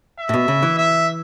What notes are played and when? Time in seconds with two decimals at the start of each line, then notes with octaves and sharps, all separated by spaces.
0.19 E5
0.29 A2
0.34 B2
0.48 C#3
0.63 E3
0.78 E5